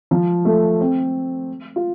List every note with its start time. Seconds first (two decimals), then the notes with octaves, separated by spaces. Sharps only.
0.11 F3
0.45 A3
0.80 C4
1.76 F4